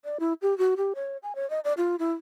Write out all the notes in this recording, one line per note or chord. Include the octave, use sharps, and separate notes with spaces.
D5
E4
G4
F#4
G4
C#5
G#5
C#5
D#5
D5
F4
E4